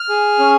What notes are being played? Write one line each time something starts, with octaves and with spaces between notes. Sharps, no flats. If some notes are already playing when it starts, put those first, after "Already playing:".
Already playing: F6
G#4
C#4